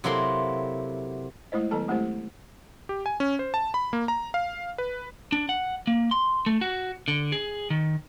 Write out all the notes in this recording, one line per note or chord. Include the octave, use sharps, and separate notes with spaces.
C3 F#3 A#3 E4 A4 C6
G#3 A3 E4 C5 D#5
D#3 F#3 B3 A4 A5
G#3 A3 C4 E4 G4 C5
G4
G#5
C#4
C5
A5
B5
A#3
A#5
F5
B4
D4
F#5
A#3
C6
A3
F#4
D3
G#4
D#3